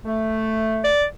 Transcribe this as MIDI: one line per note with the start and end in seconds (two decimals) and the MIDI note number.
0.04 0.92 57
0.84 1.05 74